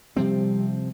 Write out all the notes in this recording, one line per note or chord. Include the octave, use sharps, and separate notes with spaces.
C3 F3 G3 C4